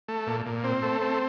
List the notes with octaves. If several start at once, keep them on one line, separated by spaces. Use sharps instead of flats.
A3
A#2
A#2
C4
A3
C4